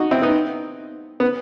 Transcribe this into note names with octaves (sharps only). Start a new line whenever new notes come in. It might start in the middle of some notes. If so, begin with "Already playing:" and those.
Already playing: D#4 F#4
C4 E4
B3 D#4
B3